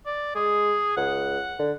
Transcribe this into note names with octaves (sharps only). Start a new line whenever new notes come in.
D5
G#3 G#4
C#2 F#5
D3